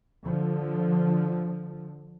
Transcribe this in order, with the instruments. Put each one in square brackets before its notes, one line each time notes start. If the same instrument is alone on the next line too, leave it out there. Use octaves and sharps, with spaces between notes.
[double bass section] D3 F3